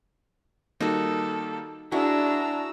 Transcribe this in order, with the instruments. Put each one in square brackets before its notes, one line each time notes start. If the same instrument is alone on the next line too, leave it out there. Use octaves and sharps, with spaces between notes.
[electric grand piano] D#3 G3 A#3 [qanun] D#4 F#4 [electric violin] A4
[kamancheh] D4 [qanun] E4 [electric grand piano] F#4 G#4 [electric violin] A#5 E6